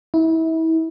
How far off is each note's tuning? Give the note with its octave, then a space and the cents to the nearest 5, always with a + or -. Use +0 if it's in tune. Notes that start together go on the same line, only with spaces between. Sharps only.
E4 -30